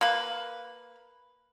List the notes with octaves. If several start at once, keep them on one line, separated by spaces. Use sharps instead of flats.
A#3 B4